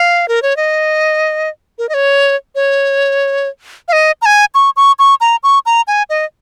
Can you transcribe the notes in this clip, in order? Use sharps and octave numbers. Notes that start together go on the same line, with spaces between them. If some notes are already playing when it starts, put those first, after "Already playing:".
Already playing: F5
A#4
C#5
D#5
A#4
D#5
C#5
C#5
F5
D#5
A#5
G#5
C#6
C#6
C#6
A#5
C#6
A#5
G#5
D#5